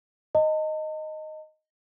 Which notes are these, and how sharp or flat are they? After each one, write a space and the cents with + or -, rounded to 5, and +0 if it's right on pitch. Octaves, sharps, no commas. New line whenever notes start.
D#5 +0 A5 +40